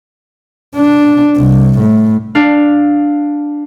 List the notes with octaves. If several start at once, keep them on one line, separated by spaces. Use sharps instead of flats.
D4
C2
A2
D4 F5